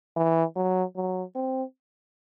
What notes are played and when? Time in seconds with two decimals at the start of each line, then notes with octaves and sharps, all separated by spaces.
0.16 E3
0.56 F#3
0.96 F#3
1.35 C4